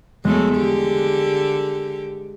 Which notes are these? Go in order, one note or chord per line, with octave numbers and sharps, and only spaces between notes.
E2 F#3 G#3 A3
D3 G4